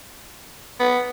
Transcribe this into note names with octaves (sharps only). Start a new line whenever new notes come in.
B3